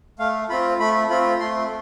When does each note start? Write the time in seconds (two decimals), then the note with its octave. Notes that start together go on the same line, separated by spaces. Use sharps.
0.19 A3 F5
0.49 C4 F4 B5
0.79 A3 B5
1.10 C4 F4 B5
1.40 A3 C6